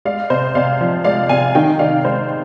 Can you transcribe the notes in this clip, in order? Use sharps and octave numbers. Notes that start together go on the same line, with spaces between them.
G#3 D5 F5
C3 C5 D#5
C3 D5 F5
F3
G#3 D5 F5
C3 F5 G#5
D#3 D#5 G5
D#3 D5 F5
G#3 C5 D#5